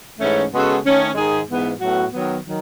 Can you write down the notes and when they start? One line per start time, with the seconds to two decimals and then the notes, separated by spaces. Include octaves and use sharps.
0.19 G#2 E3 A3 C#4
0.51 C#3 G#3 B3 F#4 A4
0.84 D#3 A3 C#4
1.15 G#2 D#3 G#3 D#4 G#4
1.47 G#2 E3 B3
1.79 A2 F#3 B3 F#4
2.11 D#3 F#3 B3
2.45 D#3 F#3